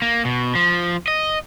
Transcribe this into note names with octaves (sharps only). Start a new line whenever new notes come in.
A#3
B2
F3
D#5